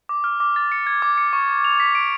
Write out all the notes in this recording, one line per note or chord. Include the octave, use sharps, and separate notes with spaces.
D6
F6
D6
A6
C#7
G#6
D6
C#7
C#6
C#6
F7
B6
D7